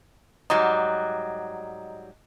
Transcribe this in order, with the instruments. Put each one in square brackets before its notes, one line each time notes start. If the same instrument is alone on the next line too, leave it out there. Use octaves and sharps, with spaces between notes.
[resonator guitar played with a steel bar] G#2 F#3 G3 [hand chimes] D#5 A#5 D#6